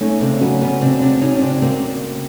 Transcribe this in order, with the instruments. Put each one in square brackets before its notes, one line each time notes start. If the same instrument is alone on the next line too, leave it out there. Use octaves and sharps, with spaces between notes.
[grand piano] A3 [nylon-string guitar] C#4 D#4
[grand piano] C#3 [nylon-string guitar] C4 D4
[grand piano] F#3 [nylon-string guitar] B3 C#4
[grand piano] C#3 [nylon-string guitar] B3 C#4
[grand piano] C#3 [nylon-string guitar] C4 D4
[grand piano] C#3 [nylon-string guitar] C4 D4
[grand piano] C#3 [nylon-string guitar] C#4 D#4
[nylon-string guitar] C#4
[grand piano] C#3 [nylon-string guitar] C4 D4
[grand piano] C#3 [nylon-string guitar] A#3 C4